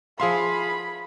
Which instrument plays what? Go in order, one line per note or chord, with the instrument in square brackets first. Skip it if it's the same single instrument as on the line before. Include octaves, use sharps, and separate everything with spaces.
[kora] F3 E5 [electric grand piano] G#4 F5 C6 [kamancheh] B5